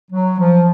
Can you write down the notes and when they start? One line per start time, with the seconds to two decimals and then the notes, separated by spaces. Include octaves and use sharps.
0.10 F#3
0.38 F3